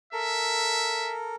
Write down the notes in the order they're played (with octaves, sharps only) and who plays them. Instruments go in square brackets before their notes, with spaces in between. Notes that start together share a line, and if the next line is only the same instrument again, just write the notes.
[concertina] A4 A#4 [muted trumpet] E5